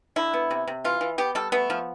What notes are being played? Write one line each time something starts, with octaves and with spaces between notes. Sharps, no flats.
D3 E4
B3
C3
C3
E3 F4
E3
B3 G4
G3 A4
A3 B3
F3